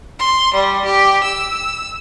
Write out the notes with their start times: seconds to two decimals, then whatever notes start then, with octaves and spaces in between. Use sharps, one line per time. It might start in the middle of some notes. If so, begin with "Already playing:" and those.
0.19 C6
0.54 G3
0.84 G4
1.23 E6